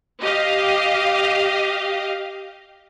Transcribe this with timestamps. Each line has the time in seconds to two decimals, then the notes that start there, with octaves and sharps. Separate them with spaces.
0.22 G4 D#5 F5